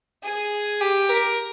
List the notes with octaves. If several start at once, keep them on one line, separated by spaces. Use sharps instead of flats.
G#4
G4
A#4